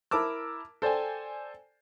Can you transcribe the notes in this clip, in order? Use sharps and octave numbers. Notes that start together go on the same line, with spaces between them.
E4 A#4 A5 D6 E6
A4 C5 D5 G5 G#5